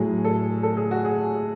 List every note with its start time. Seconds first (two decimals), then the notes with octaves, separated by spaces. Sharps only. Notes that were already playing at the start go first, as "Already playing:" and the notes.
Already playing: A2 F#3 G#4
0.24 A4
0.63 A4
0.77 G#4
0.91 F#4
1.05 G#4